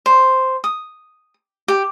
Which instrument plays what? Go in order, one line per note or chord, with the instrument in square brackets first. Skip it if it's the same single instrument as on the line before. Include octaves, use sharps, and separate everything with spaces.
[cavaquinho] C5
D#6
G4